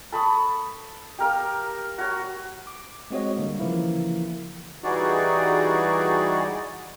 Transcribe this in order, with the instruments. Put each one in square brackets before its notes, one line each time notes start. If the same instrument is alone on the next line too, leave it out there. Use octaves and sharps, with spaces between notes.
[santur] A4 B5 C#6 D#6
G4 A#4 F5
F#4 C#5
[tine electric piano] D6
G#3 C4 F#4 C#5 D#5
D3 G3 A#3
C#3 E3 F3 A#3 E4
[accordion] E3 G3 D#4 F#4 G#4 D5